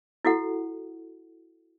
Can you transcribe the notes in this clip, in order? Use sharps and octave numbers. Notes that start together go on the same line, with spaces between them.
E4 F#4 A4 F#5